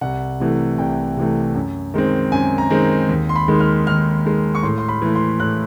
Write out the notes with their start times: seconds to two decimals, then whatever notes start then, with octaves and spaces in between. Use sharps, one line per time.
0.01 C2 F#5
0.40 C3 E3 A3
0.78 C2 G5
1.17 C3 E3 A3
1.55 F#2
1.94 D#3 G#3 C4
2.32 F#2 G#5
2.58 A#5
2.70 D#3 G#3 C4
3.09 D#2
3.29 C6
3.36 B5
3.48 D#3 G#3
3.60 F6
3.87 D#2 F6
4.25 D#3 G#3
4.55 C#6
4.63 A2 C6
4.78 C6
4.89 B5
5.02 E3 A3
5.15 C6
5.40 A2 F#6